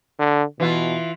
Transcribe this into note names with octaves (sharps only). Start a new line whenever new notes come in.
D3
B2 E3 F4